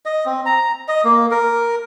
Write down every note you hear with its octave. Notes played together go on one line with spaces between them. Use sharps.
D#5
C4
A#5
D#5
A#3
A#4